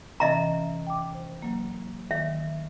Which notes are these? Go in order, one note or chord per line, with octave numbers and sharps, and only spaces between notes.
C3 E3 C#4 D#5 E5 A#5
G5 D6
C5
F#3 A#3
D#3 E5